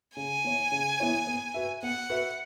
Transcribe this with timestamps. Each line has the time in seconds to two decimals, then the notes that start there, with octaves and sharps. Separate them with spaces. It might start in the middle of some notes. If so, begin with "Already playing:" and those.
0.17 C#3 G#5
0.44 E3 B3 E4 C#5
0.72 C#3
1.00 E3 B3 E4 C#5
1.27 B3
1.54 F#4 B4 E5
1.82 B3 F#5
2.09 F#4 B4 E5